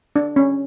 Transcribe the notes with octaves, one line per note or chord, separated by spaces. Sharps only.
D4
C#4